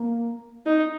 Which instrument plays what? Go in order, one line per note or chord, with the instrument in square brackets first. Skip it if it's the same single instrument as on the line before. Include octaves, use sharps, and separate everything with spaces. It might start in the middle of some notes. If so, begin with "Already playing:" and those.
Already playing: [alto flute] A#3
[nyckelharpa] D#4